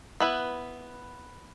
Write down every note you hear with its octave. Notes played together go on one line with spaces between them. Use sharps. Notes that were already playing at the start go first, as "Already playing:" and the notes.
B3 E4 B4